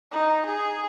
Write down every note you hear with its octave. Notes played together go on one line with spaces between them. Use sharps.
D#4
G#4